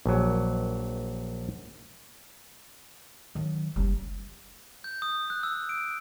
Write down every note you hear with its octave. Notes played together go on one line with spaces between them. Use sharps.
A#1 F#3
D#3 F#3
F#1 G3 C#4
G6
D#6
F#6
E6
D7